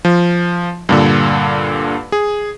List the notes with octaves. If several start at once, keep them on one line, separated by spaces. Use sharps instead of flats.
F3
G2 A#2 D3
G#4